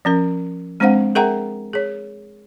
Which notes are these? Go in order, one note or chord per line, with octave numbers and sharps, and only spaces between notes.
F3 C#4 A#4
G#3 C4 D4 C5 F5 F#5
G#4 A#4 E5 F#5 G5 A#5
G#4 C#5